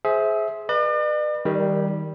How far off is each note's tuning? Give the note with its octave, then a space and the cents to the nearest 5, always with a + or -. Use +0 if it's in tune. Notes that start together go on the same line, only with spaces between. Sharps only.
G#4 +20 C5 +0 E5 -10
B4 -15 D5 +45
D#3 +20 G3 +0 A#4 +0